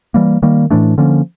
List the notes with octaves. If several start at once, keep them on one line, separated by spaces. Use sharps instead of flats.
E3 G3 A#3
D#3 G3 A#3
A2 E3 A3 D4
D3 F3 A#3 C#4